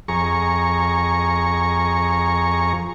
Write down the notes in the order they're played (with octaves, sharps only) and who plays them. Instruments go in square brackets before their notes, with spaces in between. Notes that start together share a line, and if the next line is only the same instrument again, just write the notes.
[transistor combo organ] F2 G#4 A#5 C#6